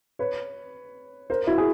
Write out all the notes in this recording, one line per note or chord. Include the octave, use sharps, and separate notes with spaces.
B4 C#5
A#4 C5
E4 F#4
G#4